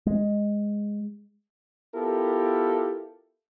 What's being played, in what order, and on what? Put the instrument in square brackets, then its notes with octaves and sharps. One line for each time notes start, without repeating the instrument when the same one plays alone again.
[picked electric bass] G#3
[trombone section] B3 E4 F4 G4 A4 A#4